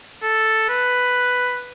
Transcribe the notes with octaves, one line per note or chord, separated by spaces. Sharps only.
A4
B4